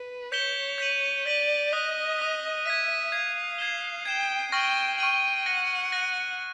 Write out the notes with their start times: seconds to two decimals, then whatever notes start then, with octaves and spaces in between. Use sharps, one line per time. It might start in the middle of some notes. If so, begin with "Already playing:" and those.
Already playing: B4
0.32 C#5 G6 B6 E7 G7
0.78 G6 B6 D#7 F#7
1.25 D5 G6 B6 D#7 F#7
1.72 D#5 D#6 F#6 B6
2.18 D#6 F#6 B6
2.65 E5 G#6 B6 D#7
3.12 F5 G#6 B6 D#7
3.58 G#6 C7 E7 G7
4.05 G5 G#6 C7 E7 G7
4.52 G5 C#6 F6 A#6 D#7 F#7
4.98 G5 C#6 F6 A#6 D#7 F#7
5.45 F#5 F#6 A#6 D#7
5.92 F#6 A#6 D#7